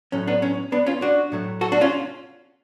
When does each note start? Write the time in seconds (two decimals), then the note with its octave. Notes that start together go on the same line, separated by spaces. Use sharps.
0.12 A2 F#3 A3 C#4
0.27 B3 D4
0.42 C#4
0.72 B3 D4
0.86 C#4 F4
1.02 D4 F#4
1.32 A2 F#3 A3
1.61 F#4 A4
1.72 D4 F#4
1.81 C#4 F4